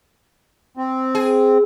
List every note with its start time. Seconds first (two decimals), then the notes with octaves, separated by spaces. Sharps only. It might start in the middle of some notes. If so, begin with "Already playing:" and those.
0.77 C4
1.15 G#4